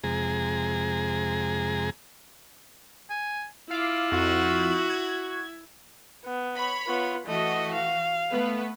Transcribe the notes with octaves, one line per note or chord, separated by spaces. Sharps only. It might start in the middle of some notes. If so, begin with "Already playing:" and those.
F2 C3 G#3 G#4 A#5
G#5
E4 F4 F5 D6
F2 F#4
G#6
B3
C#5 B5
B3 F4
E3 A3 F#4 D#5
F5
A3 B3 B4